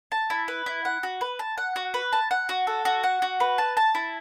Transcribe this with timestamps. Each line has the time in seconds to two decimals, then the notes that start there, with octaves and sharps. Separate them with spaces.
0.12 A5
0.30 E4
0.48 B4
0.66 E4
0.85 F#5
1.03 F#4
1.21 B4
1.39 A5
1.58 F#5
1.76 F#4
1.94 B4
2.13 A5
2.31 F#5
2.49 F#4
2.67 A4
2.85 F#4
3.04 F#5
3.22 F#4
3.40 B4
3.58 A5
3.77 A5
3.95 E4